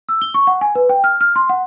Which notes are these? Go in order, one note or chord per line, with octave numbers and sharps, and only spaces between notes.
E6
G7
C#6
F#5
G#5
B4
G5
F6
F6
C6
F#5